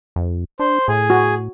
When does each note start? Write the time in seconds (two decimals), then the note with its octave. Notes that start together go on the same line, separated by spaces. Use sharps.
0.16 F2
0.59 D4 C5
0.88 A2 G#4
1.10 F#4